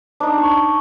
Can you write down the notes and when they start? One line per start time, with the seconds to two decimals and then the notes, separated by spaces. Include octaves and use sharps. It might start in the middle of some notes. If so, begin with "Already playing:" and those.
0.20 D4 D#4
0.38 C#6